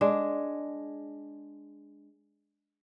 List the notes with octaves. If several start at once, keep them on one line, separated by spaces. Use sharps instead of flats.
G#3 D4